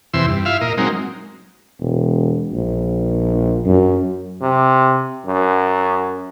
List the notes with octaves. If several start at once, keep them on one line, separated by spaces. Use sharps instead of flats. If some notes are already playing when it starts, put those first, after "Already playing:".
E2 C3 E3 C6 E6
G2
E4 F4 E5 F5
A#2 A#4 D#5
F#3 G#3 A#3 C4 D#4
E1
A#1
F#2
C3
F#2